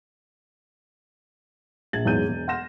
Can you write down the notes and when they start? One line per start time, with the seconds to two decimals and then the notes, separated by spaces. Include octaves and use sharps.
1.93 A#1 G#6 A6 F#7
2.05 E2 G#2 F#3 G#3 G6 D#7
2.28 E1
2.48 F#5 C6 F6 A#6 E7